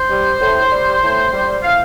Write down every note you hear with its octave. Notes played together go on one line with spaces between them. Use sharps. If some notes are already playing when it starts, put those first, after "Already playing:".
Already playing: C5
G3
A2
G3
A2
G3
A2 F5